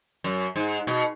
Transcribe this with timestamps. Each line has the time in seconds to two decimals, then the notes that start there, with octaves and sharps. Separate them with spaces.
0.24 F#2
0.56 G#2
0.87 B2